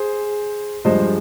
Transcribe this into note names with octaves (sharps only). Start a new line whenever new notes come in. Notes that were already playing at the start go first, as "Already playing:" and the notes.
Already playing: G#4 C5
G2 F3 G#3 C5 D#5